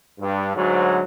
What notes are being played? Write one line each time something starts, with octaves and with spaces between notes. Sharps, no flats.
G2
D2 G#2 F#3